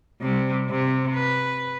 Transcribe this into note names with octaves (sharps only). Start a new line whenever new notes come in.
C3 G3
C3
B4